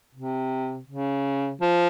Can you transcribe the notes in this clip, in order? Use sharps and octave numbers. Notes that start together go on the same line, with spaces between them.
C3
C#3
F3